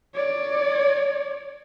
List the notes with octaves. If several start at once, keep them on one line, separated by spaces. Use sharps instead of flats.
C#5 D5